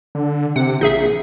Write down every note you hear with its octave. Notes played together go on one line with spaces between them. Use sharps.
D3
C3 F#5
A#1 D#4 G#4 E5